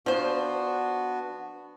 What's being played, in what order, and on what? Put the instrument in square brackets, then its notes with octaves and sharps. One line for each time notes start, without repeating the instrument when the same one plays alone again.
[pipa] F3 C5 [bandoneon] B3 F#4 [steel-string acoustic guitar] D4